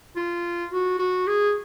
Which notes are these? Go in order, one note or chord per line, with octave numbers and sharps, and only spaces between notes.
F4
F#4
F#4
G#4